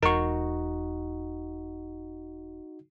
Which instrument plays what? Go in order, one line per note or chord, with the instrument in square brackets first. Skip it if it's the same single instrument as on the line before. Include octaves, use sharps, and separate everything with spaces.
[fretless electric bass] E1 [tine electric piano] D#4 F#4 [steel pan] A#4 C#6